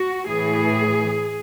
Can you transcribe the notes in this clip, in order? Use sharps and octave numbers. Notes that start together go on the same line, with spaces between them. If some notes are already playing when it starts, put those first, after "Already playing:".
Already playing: F#4
A2 E3 G#4